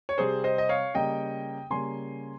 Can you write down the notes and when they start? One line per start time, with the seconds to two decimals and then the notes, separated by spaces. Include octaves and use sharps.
0.09 C#5
0.18 C3 G3 C4 G#4 C5
0.44 C5 D#5
0.58 D#5
0.69 C#5 F5
0.94 C#3 G3 A#3 D#5 G5
1.70 C#3 G3 A#3 G#5 C6